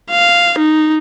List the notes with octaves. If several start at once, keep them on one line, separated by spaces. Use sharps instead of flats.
F5
D#4